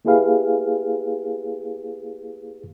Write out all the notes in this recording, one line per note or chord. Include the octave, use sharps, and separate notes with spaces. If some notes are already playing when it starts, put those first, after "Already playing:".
A#3 E4 G4 G#4 B4 F5